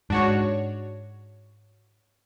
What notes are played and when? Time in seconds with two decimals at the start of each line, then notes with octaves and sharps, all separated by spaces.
0.10 G#2 D4 F#4 C#5